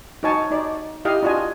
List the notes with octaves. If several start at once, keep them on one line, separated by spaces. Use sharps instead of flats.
D#4 F#4 C#5 G#5 A5 C#6
D#4 D5
E4 G4 D#5 F5
D4 F4 F#4 D#5 G#5